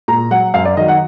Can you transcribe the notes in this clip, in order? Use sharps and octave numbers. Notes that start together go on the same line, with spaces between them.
A#2 A#5
F#3 F#5
F#2 F5
D5
D#3 F#3 D#5
F#5